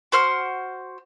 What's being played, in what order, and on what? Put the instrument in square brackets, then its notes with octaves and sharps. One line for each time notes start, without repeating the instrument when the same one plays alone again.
[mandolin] F#4 C5 F6